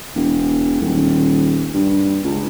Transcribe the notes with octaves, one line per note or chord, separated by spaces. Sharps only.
E1
D#1
G2
C#2